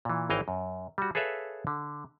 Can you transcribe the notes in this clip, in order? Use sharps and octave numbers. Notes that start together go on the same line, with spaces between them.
A#2 E3
G#1 E3 C#5 D#5 F5 G5
F#2
G3 F#4
G#4 A4 B4 C#5 E5 F5
D3